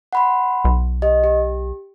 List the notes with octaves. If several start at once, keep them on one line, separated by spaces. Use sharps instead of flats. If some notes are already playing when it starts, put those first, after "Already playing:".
F#5 B5 C6
B1
G4 D#5
G4